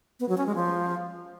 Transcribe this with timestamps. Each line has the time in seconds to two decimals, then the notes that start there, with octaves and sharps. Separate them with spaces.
0.20 B3
0.29 F#3
0.38 C#4
0.46 G#3
0.55 F3